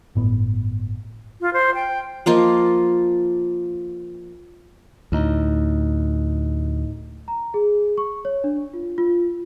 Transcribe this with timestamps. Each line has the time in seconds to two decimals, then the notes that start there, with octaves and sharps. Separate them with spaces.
0.15 G1 A2 B3
1.41 F4
1.53 C5
1.74 G5
2.26 F3 A#3 F4 D#5
5.12 D2 A2 D#4
7.28 A#5
7.54 G#4
7.98 C#6
8.25 C#5
8.44 D4
8.73 F4
8.98 F4